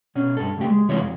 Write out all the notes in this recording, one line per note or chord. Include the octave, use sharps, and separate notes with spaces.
B2 C#4
G2 A4
C#2 A2 G4
G#3
C3 E3 E4 F4 C#5
F2